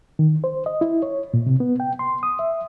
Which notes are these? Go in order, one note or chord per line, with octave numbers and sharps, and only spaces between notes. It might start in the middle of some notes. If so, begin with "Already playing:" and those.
D#3
C5
D#5
E4
C#5
A#2
C3
B3
G5
C6
D#6
E5